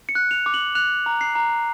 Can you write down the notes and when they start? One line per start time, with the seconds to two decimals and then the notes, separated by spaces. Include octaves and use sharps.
0.09 C#7
0.15 F#6
0.31 F7
0.46 D6
0.54 F#7
0.75 F#6 F7
1.06 A#5
1.21 C7
1.35 A#5